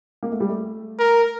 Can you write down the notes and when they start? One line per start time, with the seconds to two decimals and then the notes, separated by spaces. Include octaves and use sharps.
0.23 A#3
0.32 A3
0.40 G3
0.49 A3
0.99 A#4